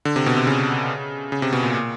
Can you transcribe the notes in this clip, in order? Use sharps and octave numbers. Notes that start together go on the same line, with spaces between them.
D3
C3
B2
C3
C#3
C#3
C3
B2
A#2
A#2